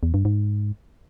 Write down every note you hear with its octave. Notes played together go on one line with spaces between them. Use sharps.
E2
G2
G#2